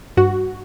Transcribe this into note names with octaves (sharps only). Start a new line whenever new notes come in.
G2 F#4